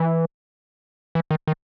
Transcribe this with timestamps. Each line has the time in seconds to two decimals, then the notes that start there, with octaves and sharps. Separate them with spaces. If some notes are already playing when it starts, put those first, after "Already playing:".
Already playing: E3
1.15 E3
1.31 D#3
1.48 D#3